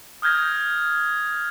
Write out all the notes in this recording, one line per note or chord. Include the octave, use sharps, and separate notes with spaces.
D#6 F6 G6 G#6 A#6